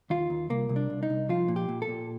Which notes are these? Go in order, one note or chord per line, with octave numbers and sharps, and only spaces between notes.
D#2 F4
D#2
C2 A#3
C2
D4
C2
D#4
C2
F3 F4
A#2
G4
A#2
A4
A#2